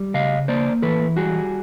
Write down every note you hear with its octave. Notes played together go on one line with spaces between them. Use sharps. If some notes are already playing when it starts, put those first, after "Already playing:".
Already playing: G3
C#3 D#5 F5
A#3 C5 D5
E3 A4 B4
G3 F#4 G#4